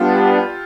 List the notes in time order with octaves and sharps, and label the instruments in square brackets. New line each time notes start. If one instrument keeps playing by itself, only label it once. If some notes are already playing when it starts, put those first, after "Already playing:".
Already playing: [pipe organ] G3 B3 D4 [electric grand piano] F4 G4 A4